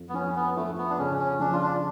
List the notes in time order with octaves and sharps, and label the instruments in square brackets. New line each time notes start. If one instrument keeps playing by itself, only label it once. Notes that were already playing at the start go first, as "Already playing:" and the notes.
Already playing: [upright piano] F2 F3
[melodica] B3
[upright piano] F3 [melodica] C#4
[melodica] B3
[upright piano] F3 [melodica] A3
[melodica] B3
D4
[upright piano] C#3 [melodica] C#4
[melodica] C#4
[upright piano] F3 [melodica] D4
[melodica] F4
D4